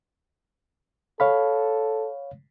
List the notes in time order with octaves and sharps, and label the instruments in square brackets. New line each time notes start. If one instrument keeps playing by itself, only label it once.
[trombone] A4 [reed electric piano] C#5 F5 B5